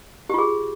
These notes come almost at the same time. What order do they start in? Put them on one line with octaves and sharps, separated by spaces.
G4 F4 G#4